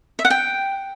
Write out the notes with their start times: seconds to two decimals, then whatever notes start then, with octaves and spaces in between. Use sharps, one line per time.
0.19 E5
0.25 F#5
0.30 G5